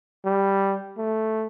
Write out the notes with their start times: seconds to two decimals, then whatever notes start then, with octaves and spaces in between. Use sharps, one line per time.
0.25 G3
0.98 A3